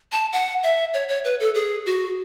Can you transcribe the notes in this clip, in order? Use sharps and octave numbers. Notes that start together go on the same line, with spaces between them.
A5
F#5
E5
C#5
C#5
B4
A4
G#4
F#4